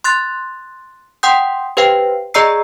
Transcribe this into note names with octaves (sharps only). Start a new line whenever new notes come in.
C6 F#6 A6
F#5 G5 C6 D#6 G6
G4 B4 C5 F5 G5
G#4 D5 D#5 A#5 E6 C7